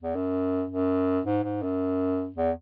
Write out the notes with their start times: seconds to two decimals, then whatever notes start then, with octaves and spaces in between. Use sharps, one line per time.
0.03 E2
0.15 F#2
0.70 F#2
1.25 G#2
1.43 G#2
1.63 F#2
2.36 E2